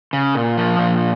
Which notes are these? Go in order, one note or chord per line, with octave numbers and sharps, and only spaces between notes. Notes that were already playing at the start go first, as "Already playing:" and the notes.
C#3
A#2
F3
A#2